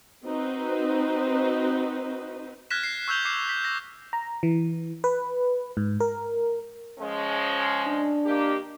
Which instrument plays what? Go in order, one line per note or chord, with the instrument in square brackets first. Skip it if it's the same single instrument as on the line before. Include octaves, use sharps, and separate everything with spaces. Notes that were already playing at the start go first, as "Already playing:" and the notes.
[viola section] C4 D#4 F#4 B4 C5
[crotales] F6 F#6 G#6 A#6 B6 E7
C7
C#6 E6 F#6 G6 F7 G7
D6 C7 E7
B6
A#6
[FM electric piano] A#5
E3
B4
G#2
A#4
[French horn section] F3 G#3 C#4
[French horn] D4
[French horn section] D#3 A#3 G4